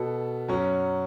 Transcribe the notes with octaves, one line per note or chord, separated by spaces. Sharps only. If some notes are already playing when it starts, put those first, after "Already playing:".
Already playing: B2 B3 A4
F#2 F#3 C#4